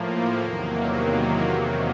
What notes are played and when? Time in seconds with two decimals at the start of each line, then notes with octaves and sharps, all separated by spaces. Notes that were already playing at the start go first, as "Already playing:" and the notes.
Already playing: A2 F3 A#3
0.40 E2 C3 D#3 F#3 A#3